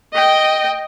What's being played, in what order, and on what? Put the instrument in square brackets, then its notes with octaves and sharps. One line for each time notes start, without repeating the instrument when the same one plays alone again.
[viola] D#5 G5